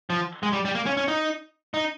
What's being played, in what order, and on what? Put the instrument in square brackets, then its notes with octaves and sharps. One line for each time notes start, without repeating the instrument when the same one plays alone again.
[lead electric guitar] F3
G#3
G3
G3
A#3
C#4
C#4
D#4
D#4